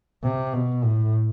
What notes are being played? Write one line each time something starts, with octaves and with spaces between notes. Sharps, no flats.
C3
B2
A2